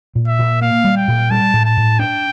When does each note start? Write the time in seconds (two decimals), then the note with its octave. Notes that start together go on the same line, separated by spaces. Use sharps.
0.15 A#2
0.27 E5
0.39 A#2
0.61 A#3 F5
0.84 G3
0.96 G5
1.08 A#2
1.31 G3 A5
1.53 A2
1.65 A5
1.77 A2
1.99 D4 G5